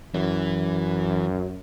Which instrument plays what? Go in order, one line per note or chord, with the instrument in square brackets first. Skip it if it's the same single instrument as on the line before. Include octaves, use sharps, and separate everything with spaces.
[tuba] F#2 [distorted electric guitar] E3